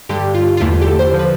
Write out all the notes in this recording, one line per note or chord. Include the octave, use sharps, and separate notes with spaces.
G2 D3 G3 G4
F4
F4
E2 D3 A3 E4
G4
A4
C5
D3 F3
B4